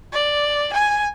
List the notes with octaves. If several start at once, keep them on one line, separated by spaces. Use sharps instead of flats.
D5
G#5